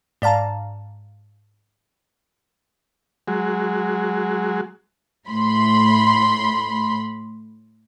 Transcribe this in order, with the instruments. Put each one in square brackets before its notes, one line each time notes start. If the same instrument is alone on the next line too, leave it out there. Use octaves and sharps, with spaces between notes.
[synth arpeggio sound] G#2 D5 F5 A5 A#5
[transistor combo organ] F#3 G#3
[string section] A2 B5 C6